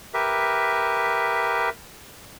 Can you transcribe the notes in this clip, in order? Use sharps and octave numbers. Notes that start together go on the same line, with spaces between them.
G4 A#4 B4 E5